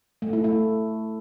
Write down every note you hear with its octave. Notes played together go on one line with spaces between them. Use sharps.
A3
E4
A3